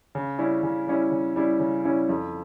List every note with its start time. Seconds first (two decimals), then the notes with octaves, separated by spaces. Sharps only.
0.15 C#3
0.39 G3 C#4 E4
0.63 C#3
0.88 G3 C#4 E4
1.12 C#3
1.36 G3 C#4 E4
1.60 C#3
1.84 G3 C#4 E4
2.09 F2